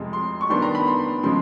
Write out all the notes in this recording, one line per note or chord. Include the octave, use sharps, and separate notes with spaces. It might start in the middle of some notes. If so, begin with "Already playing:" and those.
Already playing: F2 C3 F3 G#3
C6
C#6
D#3 G3 B3 D4 C6
A#5
B5
C6
C#3 F3 G#3 C6